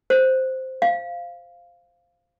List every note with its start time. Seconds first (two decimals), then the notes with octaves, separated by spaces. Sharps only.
0.10 C5
0.82 F5